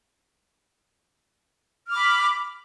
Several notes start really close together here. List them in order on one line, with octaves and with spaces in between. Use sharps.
F6 D6 B5